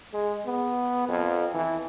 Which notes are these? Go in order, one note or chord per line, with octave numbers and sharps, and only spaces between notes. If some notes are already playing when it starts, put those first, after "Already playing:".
G#3
B3
F2
E3